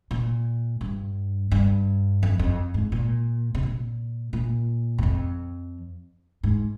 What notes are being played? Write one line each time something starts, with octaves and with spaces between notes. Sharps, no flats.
A#2
G2
G2
F2
F2
G#2
A#2
C3
A#2
A#2
G2
F2
G#2